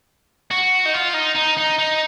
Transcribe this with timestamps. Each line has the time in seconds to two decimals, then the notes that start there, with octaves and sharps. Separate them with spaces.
0.51 F#4
0.85 D#4
0.94 F4
1.14 D#4
1.35 D#4
1.58 D#4
1.79 D#4